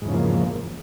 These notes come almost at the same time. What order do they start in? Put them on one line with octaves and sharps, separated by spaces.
G#2 E2 C#3 F3 A#3